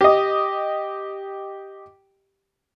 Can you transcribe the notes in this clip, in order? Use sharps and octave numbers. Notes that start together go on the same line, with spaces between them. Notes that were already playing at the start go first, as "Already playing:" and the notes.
G4 D#5